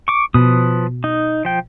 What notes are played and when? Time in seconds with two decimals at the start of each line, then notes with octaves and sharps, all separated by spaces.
0.08 C#6 D6
0.34 B2 F3 B4 D#6
1.04 D#4
1.45 F3 G5